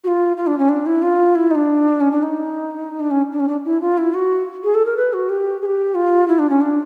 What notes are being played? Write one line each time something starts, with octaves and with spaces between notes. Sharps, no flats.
F#4
F4
F4
D4
C#4
D4
E4
F4
E4
D#4
D4
C#4
D4
D#4
D4
C#4
D4
C#4
D4
E4
F4
E4
F#4
G#4
A4
A#4
B4
F#4
G4
G#4
G4
F4
E4
D4
C#4
D4